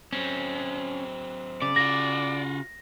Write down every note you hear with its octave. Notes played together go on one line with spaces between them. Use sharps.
F#3 C4 C#4
C#3 D5
F4 F#4 A#6